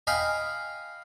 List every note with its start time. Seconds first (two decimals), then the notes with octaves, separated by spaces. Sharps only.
0.07 D#5 F5 G5 G#5 B5